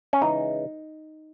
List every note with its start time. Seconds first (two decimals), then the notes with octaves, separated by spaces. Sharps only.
0.13 C#4
0.22 C#3 E3 G#3 D#4